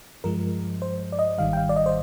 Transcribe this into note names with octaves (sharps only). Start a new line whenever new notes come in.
G2 F3 G#3 A#4
C5
D5
D#5
G#1 G#2 D#3 G3 F5
G5
F5
D5
D#5
C5